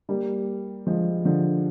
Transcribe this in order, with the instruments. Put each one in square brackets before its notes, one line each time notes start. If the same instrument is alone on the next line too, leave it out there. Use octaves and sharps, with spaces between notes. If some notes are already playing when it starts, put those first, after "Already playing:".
[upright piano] G3 A#3
F3 G#3
D3 F3